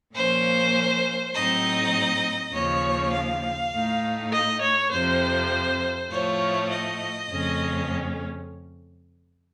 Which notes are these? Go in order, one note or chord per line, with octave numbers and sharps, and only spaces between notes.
A#2 F3 A#3 C#4 C5
A2 F#3 C4 D#4 D#5
D#2 C#3 F3 C#5
F5
A2 A3 D#4
D#5
C#5
F2 C3 F3 C5
A2 F3 A3 C#5
D#5
F2 C#3 A3 C#4